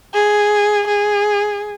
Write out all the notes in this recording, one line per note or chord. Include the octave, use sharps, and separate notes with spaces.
G#4
G#4